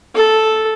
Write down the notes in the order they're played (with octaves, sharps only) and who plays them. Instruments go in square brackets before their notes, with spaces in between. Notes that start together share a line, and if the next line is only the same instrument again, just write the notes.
[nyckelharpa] A4